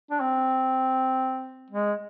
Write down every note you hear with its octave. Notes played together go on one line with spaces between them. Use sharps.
D4
C4
G#3